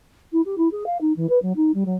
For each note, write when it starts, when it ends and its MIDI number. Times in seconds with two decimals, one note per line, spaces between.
0.32 0.41 64
0.45 0.56 67
0.58 0.68 64
0.72 0.84 68
0.86 0.98 77
1.01 1.13 63
1.16 1.29 52
1.29 1.39 71
1.42 1.53 54
1.56 1.72 63
1.74 1.84 55
1.86 1.97 54